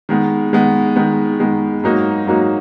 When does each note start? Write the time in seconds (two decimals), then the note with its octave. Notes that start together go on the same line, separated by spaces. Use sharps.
0.09 D#3 G#3 B3
0.53 D#3 G#3 B3
0.96 D#3 G#3 B3
1.40 D#3 G#3 B3
1.83 G#2 F#3 A#3 D#4 F#4
2.27 G#2 F#3 A#3 D#4 F#4